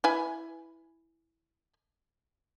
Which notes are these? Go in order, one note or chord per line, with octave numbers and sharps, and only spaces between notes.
E4 B4 G#5